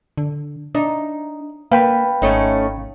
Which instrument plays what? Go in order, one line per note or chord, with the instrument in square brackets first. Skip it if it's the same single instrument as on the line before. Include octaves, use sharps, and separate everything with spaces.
[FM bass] D3
[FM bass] D4 [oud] D#4
[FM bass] A#3 [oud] B4 [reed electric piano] F5 G5 B5
[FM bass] G#1 [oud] A3 C#4 D#4